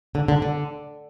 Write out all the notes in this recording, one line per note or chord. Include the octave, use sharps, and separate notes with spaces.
D3
D3
D3